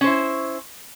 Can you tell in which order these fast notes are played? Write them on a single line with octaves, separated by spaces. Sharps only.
C#4 C5 E4